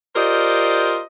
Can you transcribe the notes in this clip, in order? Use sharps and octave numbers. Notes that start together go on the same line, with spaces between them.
F4 G4 A#4 C5 D5 D#5